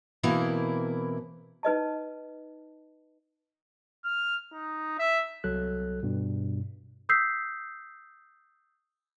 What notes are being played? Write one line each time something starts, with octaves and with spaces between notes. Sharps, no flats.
B2 E3 A#3 C4 E4 A#4
D#4 B4 D#5 A5
F6
D#4
E5
C2 F#3 A4 F#6
G2 B2
D#6 E6 G6 B6 C7